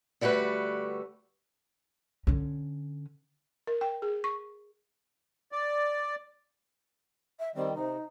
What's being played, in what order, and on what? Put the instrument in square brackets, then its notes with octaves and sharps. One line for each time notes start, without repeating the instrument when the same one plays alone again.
[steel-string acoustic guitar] D3 G3 A3 F#4 B4
[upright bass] D3 C#4
[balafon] A#4
G5
G#4
C#6
[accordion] D5
[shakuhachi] E5
[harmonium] D#3 G3 [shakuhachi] C4
[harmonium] C3 [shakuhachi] D#4